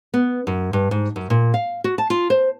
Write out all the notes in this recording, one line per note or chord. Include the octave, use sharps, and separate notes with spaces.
B3
F#2
G2
G#2
F#2
A#2
F5
F#4
A5
F4
C5